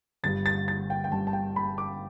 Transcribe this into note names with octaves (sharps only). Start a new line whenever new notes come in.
G1 G2 G3 A6
A6
A6
G5
G5
G1 G2 G3 A5
A5
G5
B5
D6